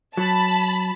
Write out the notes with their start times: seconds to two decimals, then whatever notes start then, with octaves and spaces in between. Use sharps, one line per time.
0.17 F#3 A5 B5